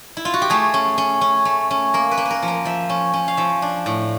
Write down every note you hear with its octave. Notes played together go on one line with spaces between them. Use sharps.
E4
F4
F#4
G4
A3 G#4
C#4
C#4
C#4
A3
C#4
A#3 A#4
B4
A#3
B4
A#4
F3
A#4
F3 E5
C#4
C#4
F5
F3 E5
D4
A2